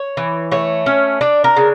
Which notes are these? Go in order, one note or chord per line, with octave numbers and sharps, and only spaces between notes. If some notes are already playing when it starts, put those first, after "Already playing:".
Already playing: C#5
E3
A3 C#5
C#4
D4 D5
A#4
C#3